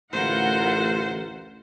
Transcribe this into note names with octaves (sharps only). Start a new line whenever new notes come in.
A1 D2 E4 F4 A#4 C5 F#5